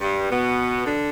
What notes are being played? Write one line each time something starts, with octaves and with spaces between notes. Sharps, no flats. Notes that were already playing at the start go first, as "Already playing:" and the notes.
G2 G3
B2 B3
D3 D4